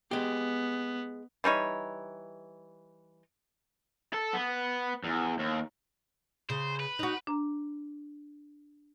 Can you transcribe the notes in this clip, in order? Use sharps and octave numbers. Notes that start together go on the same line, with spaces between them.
G#3 B3 G4
E3 G3 D#4 C#5
A4
B3
E2
D#2
C#3 C5
B4
D#4 F#4
D4 A#5